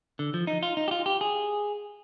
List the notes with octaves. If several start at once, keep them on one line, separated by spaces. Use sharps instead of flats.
D3
F3
D#4
F4
D#4
G4
F4
G4
G#4